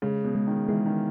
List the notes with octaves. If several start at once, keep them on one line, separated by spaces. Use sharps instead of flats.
C#3 G#3
B2
G#3
D#3
E3 G#3
D#3